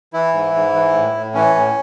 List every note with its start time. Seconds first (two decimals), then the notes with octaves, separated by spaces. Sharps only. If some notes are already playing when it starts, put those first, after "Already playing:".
0.13 E3 E4
0.34 G#2
0.54 G#2
0.74 E3
0.93 A2
1.14 A2
1.34 E3 C#4
1.55 A2